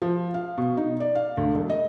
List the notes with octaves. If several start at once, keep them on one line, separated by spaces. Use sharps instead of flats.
F3
F5
B2
D#4
D5
F5
D2
E1
D#5